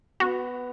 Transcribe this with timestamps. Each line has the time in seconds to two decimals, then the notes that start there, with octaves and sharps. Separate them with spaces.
0.20 B3 F#4